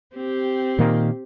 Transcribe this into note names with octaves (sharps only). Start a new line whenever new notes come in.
C4 G4
A#2 D#3 A#3